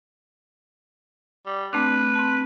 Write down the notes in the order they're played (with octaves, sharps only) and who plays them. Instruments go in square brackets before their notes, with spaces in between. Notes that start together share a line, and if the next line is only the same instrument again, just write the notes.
[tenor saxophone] G3
[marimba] A3 C4 D4 [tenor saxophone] B4
[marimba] C4 A5